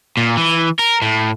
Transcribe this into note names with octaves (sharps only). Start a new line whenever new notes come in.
A#2
E3
A#4
A2